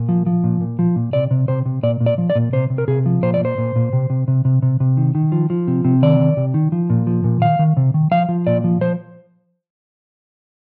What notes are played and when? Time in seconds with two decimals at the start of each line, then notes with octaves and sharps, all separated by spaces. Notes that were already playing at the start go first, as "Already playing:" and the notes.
Already playing: A#2
0.09 F3
0.26 F3
0.44 A#2
0.61 A#2
0.79 F3
0.96 A#2
1.13 C3 D5
1.31 C3
1.48 C3 C5
1.66 C3
1.83 A#2 D5
2.00 A#2
2.06 D5
2.18 F3
2.30 D5
2.35 A#2
2.53 C3 C5
2.70 C3
2.78 A#4
2.88 C3 G#4
3.06 F3
3.23 A#2 C5
3.34 D5
3.40 A#2 C5
3.58 A#2
3.76 A#2
3.93 C3
4.10 C3
4.28 C3
4.45 C3
4.62 C3
4.80 C3
4.97 D#3
5.15 D#3
5.32 F3
5.50 F3
5.68 C3
5.85 C3
6.02 D#3 D5
6.19 D#3
6.37 C3
6.54 D#3
6.72 F3
6.90 A#2
7.07 F3
7.24 A#2
7.41 D#3 F5
7.59 D#3
7.77 C3
7.94 D#3
8.11 F3 F5
8.29 F3
8.47 A#2 D5
8.64 F3
8.81 F3 C5